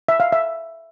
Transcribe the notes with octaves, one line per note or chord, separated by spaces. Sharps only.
E5
F5
E5